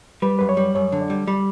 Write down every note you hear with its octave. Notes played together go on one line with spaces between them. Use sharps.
G3 B4
F#2 B4
C#5
G3
F#2 C#5
D3
D5
G3
G3